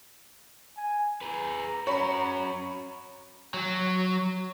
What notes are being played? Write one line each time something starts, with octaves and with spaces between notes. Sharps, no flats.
G#5
G#4 B4 A#5
C#4 F#4 C#5 B5
F#3